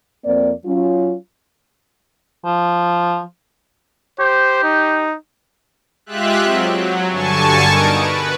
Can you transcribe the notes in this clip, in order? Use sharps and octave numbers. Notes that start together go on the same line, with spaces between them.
F2 A#3 C4 D5
F#3 C#4 F4
F3
G4 C5
D#4
G#3 F4 G4 E5 F#6
F#3 C4
F#3
G2 D3 G#5 A5 C#6
B2 D#4 A#4 D#6 D7
B4